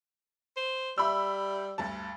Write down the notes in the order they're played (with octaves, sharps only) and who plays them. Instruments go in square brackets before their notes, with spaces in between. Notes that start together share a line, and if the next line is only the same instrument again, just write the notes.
[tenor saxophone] C5
[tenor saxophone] G3 [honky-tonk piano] E5 B5 E6
[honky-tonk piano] D2 G2 A5